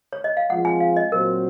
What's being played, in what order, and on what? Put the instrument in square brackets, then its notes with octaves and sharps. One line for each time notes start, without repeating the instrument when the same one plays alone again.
[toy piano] C#5
D#5
F5
[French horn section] F3 G#3 C4 F4 [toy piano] F#5
[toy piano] G#5
F5
D#5
[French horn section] A#2 F#3 C4 F#4 C5 [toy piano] A#4